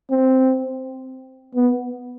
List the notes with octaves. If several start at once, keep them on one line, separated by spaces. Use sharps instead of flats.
C4
B3